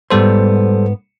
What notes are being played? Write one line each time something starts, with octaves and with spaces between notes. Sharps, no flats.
G#2 G3 B3 A4 C5 C6